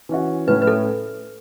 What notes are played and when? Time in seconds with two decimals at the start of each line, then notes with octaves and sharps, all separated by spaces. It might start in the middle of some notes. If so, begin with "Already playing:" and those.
0.09 E3 C#4 F#4
0.48 A2 A3 C#4 E4 B4
0.62 B4
0.67 A4